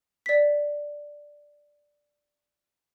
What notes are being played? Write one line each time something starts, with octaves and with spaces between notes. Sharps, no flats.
D5 B6